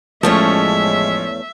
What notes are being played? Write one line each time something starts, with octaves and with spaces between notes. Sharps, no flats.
A1 E2 F3 G#3 A3 C#4 C#5 E5